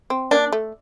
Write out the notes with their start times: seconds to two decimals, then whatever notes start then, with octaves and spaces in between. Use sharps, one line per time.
0.10 C4
0.31 A#3 D4
0.52 A3